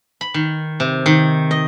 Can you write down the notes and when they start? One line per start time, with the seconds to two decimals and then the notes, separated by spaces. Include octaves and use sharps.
0.21 B5
0.34 D#3
0.80 C3
1.06 D#3
1.51 D#5